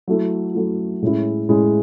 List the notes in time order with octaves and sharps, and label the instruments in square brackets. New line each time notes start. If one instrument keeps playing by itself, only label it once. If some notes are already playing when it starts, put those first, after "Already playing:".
[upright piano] F#3 A3 E4
F#3 A3 E4
A2 G#3 C#4 E4
A2 G#3 C#4 E4